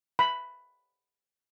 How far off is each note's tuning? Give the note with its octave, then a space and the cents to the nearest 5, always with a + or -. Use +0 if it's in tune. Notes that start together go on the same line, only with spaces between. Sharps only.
B5 +5